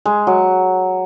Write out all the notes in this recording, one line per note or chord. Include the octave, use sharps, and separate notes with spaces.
G#3
F#3